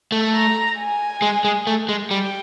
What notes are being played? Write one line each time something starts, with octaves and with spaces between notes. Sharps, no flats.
A3
A#5
G#5
G#3
G#3
A3
G#3
G3 G5